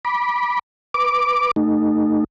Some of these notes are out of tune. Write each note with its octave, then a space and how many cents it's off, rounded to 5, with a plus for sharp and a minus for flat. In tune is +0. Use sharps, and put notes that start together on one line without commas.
B5 -20 D6 +0
B4 +0 D6 +0
A3 +15 D#4 -20